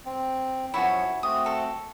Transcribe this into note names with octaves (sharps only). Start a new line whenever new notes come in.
C4
F#2 F3 E4 F#4 C#5 G#5
A3 C4 F#4 D#6
A4